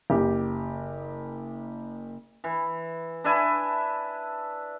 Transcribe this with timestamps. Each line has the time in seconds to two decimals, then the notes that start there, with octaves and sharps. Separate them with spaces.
0.10 F#1 G4
2.44 E3
3.24 D4 B4 E5 G#5